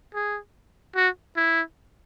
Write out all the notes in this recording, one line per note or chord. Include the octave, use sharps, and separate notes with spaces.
G#4
F#4
E4